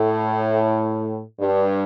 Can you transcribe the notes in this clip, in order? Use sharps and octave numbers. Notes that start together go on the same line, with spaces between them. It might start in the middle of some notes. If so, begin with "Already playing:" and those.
Already playing: A2
G2